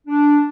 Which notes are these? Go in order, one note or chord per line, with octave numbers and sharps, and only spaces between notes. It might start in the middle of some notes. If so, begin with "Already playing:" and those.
D4